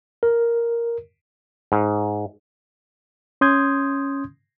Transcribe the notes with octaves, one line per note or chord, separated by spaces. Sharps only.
A#4
G#2
C#4 C6 D#6 G6 G#6